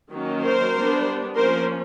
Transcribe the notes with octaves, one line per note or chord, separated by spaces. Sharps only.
D#3 F#3 A#3 C#4
A#4 C5
G3 B3 D4
F3 A#3 C#4 A#4 C5